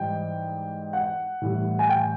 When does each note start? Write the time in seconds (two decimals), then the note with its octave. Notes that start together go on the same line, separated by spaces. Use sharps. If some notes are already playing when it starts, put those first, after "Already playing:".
Already playing: G#2 E3 G3 G5
0.93 F#5
1.41 A2 E3 G3
1.79 G#5
1.89 G5